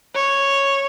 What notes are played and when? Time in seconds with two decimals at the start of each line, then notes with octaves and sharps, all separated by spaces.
0.15 C#5